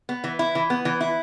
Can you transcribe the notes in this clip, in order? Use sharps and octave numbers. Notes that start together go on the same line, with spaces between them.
B3
E3
E4
E3
B3
E3
E4